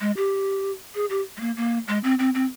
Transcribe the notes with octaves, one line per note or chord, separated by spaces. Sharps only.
G#3
G4
G#4
G4
G#3
A#3
A#3
G#3
C4
C4
C4